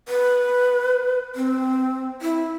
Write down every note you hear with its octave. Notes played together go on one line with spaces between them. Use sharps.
B4
C4
E4